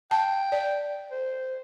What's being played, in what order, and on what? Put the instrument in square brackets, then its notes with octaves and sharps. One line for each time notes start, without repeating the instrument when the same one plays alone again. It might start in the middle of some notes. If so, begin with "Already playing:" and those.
[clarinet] G5 [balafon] A5
[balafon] D5
[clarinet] C5